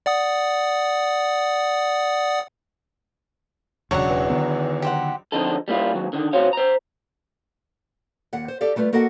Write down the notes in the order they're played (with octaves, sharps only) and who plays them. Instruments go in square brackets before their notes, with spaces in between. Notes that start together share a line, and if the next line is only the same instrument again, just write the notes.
[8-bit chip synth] D5 F#5 D#6
[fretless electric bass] E1 C#3 [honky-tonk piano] C#2 F#3 D4 [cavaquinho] C#5 F#5
[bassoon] E2
[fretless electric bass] D3 D#3 B3
[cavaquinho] G4 C5 F#5
[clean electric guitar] D3 F3 G#3 C4 D#4 A4
G3 A#3 E4 F4
D#2 F#3
D3 D#3
C3 F#4 C5 C#5 F5
C5 A#5
[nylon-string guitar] D#2 F#5
C5
G4 A4 D5 F5
G3 A3 F4 B4
A#3 F#4 A4 A#4 D#5 F#5